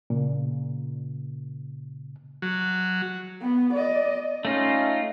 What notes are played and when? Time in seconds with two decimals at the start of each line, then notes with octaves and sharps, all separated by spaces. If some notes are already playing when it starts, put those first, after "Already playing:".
0.10 A#2 C#3
2.42 F#3
3.41 B3
3.74 D5 D#5
4.45 A3 C#4 D#4 F4